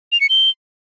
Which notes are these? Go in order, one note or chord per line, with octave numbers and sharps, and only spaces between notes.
F7
C#7
G7